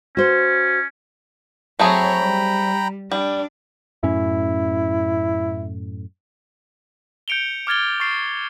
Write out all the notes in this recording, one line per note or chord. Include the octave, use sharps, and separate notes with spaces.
C#4 F#4 C5
F#3 A3 C4 G#4 C#5 G5 A#5 B5
G3
G3 D4 D5
F#2 A2 C#4 E4
G6 C#7 D7 F7 G7
D6 F6 G#6 A6 G7
C#6 A6 C7 D7